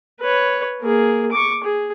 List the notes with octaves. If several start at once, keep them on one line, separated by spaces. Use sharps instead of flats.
B4 C#5
A#3 G#4
C#6 D6
G#4